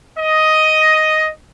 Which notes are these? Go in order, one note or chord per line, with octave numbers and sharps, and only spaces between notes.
D#5